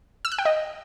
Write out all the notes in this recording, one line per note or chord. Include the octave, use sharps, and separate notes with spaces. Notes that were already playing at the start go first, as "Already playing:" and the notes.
E6
F#6
G5
D#5